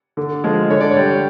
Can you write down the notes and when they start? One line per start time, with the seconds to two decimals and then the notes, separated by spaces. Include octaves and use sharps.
0.17 D3
0.44 F3 G#3
0.70 D3 C#5
0.81 D5
0.91 C#5
0.97 G3